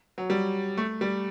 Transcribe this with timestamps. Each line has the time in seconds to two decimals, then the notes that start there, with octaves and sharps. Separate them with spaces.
0.18 F#3
0.30 G3
0.77 A3
1.01 G3